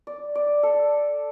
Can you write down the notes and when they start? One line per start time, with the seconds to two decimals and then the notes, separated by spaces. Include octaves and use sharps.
0.07 D5
0.35 D5
0.63 A4